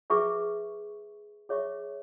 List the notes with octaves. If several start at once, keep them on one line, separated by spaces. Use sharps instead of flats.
G#4 B4 E5 C#6
G#4 C#5 E5 C#6